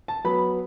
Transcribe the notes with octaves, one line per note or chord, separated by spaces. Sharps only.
A5
F#3 B3 B5